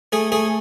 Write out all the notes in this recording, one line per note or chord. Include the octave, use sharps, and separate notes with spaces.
A3 G#4
A3 G#4